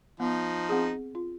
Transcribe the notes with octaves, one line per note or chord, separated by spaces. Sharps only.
F3 B3 D#4
C4 G#4
F4